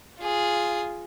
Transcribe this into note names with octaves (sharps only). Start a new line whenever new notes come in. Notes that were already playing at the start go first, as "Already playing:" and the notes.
F4 G#4